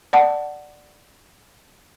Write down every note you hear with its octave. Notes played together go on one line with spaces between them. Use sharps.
D5 F#5 A5